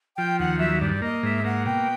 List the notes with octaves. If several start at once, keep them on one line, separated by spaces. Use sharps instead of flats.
F3 G5
D#2 F#5
F#3 E5
G2 D5
A#3 D#5
G#2 E5
A#3 F#5
B2 G5